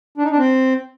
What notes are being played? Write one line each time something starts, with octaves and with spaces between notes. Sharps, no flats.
D4
D#4
D4
C4